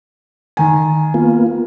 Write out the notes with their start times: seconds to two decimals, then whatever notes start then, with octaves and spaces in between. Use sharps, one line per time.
0.57 D#3 G#5
1.14 A#3 B3 F4